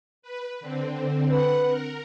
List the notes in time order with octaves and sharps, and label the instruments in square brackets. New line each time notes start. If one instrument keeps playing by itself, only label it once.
[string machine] B4
D3 C4
[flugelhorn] B4 [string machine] F#5
[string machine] A#4